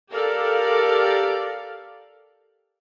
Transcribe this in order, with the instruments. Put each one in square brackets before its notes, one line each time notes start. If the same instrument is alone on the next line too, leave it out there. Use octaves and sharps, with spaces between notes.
[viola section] G4 A4 A#4 D5 F5